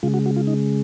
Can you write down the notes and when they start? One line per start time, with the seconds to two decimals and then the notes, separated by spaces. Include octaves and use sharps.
0.03 C#3 G#3 F4
0.14 F#4
0.26 F#4
0.36 F4
0.47 D#4